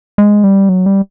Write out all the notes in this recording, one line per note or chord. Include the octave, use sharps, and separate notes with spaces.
G#3
G3
F#3
G3